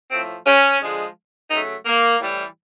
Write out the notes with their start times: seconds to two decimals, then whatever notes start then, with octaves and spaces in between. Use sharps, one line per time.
0.12 A2 F3 A3 C4
0.47 C#4
0.81 D3 F3 G#3
1.51 C#3 F#3 A3 D#4
1.86 A#3
2.20 A2 E3 G3